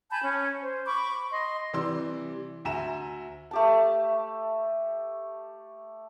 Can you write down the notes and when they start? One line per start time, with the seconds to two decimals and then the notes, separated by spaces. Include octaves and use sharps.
0.11 G#5 A5 B5 G6
0.23 C#4
0.62 C5
0.86 B5 C#6 D6
1.31 D#5 C6
1.73 C3 E3 G3 D5 C6 E6
2.65 D2 E5 G#5 A#5 E7
3.51 A3 G4 A5